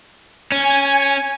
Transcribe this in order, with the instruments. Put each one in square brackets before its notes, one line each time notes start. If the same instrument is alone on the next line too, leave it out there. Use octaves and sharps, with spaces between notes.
[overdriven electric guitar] C#4 [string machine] G#5 G#6